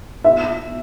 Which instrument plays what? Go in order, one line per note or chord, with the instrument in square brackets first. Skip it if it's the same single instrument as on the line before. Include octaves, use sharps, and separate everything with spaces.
[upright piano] E5